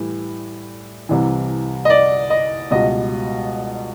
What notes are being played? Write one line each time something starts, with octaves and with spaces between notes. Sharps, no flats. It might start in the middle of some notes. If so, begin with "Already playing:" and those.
Already playing: A2 E3 G3
C2 C3 E3
D#5
D5
D#5
C#2 B2 G3 D#5